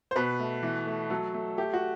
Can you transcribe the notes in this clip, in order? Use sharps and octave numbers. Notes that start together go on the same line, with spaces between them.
C5
B2 B4
A3
E3
A3
F#3 A4
A3
A3 G4
F#4